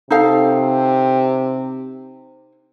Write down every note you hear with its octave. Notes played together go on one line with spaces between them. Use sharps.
C3 D#4 A4 F5